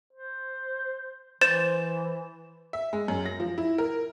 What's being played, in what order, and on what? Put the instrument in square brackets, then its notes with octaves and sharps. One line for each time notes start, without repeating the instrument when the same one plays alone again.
[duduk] C5
[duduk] E3 [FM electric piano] C5 [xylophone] G6 A6 E7
[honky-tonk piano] E5
G#3
F#2
A#6
F3
E4
A#4